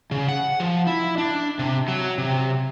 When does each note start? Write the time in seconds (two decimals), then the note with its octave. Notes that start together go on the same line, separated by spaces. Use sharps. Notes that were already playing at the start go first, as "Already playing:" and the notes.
0.11 C#3
0.29 F#5
0.60 F3
0.87 E4
1.18 D4
1.59 C3
1.88 F#3
2.18 C3